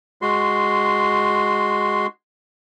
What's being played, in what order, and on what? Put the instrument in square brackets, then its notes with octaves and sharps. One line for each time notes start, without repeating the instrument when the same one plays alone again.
[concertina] G#3 F#4 C6